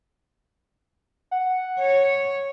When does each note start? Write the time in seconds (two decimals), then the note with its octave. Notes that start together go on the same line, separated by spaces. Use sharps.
1.31 F#5
1.79 C#5